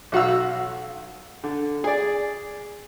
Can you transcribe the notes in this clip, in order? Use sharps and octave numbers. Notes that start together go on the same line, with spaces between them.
B1 F#4 F5 E6
D3
G#4 D5